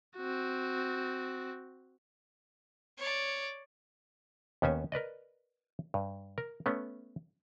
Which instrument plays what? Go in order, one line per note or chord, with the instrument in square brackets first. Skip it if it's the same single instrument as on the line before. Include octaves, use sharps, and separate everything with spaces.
[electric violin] C4 F#4
[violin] C#5 D5
[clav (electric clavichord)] D#2 B3 C#4 C5 G#5
A#4 B4 D5 D#5
G2
A#4
A3 B3 C#4